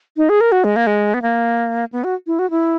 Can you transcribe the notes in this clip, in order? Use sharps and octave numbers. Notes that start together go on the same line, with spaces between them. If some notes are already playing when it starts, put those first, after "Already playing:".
D#4
G#4
A#4
F#4
G#3
A#3
G#3
B3
A#3
B3
F#4
E4
F#4
E4